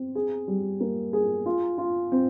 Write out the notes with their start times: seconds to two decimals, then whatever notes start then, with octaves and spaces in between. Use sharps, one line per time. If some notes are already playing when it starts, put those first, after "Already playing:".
Already playing: C4
0.15 G#4
0.48 G3
0.80 A#3
1.13 G#4
1.46 F4
1.78 F4
2.12 C4